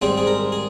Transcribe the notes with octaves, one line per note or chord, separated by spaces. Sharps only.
G#2 G3 C4 G#4
G#4
A#4
G#4